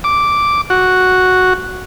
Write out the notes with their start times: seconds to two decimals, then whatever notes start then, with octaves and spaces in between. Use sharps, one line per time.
0.04 D6
0.70 F#4